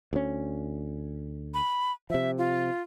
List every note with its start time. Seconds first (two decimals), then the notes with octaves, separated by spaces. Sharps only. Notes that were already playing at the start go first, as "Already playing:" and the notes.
0.13 D2 C#4
1.54 B5
2.10 C3 F3 E5
2.38 F4